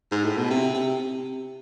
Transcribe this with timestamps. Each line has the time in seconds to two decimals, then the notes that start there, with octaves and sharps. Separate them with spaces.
0.12 G#2
0.24 A2
0.37 B2
0.50 C3
0.75 C3